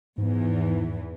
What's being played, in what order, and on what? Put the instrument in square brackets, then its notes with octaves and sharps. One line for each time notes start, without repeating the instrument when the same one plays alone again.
[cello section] E2 E3 [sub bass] G#2